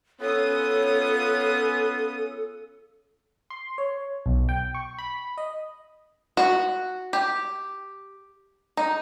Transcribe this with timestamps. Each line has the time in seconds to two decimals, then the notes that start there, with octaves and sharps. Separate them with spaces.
0.20 B3 C#4 F4 A4 D#6
3.50 C6
3.78 C#5
4.26 B1
4.49 G5
4.74 C#6
4.98 B5
5.37 D#5
6.37 F#4
7.13 G4
8.77 D#4